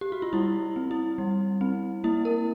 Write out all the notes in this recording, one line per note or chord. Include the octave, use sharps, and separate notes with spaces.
G4
F#4
F4
G3 E4
C4
E4
G3
C4
A#3 E4
A#4